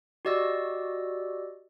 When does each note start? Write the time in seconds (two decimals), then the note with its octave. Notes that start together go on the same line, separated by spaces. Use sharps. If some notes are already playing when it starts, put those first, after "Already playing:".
0.25 F#4 G4 D5 D#5 E6